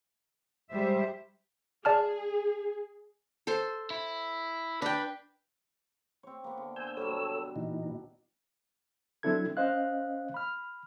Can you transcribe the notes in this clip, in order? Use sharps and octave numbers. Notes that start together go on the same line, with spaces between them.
G3 G#3 C5 E5
G#4 D5 A5 F6
A4 C5 C6
E4
D4 B4 G5
C4 C#5
A#3 B3
D3
C5 G#5 E6 G6
B2 F#3 G3 A4 C#5 E6
A#2 E3 D#4
F#3 C4 D4 E4 A4 G#6
C#4 C5 D#5 F5 F#6
B5 F6